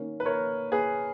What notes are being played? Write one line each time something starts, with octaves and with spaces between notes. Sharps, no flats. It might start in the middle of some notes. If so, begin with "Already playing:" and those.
Already playing: D#3 A#3 C#4
B4
A#4 C#5
G#4 B4